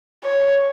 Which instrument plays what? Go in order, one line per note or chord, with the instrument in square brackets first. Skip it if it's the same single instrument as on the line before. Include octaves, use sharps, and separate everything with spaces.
[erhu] C#5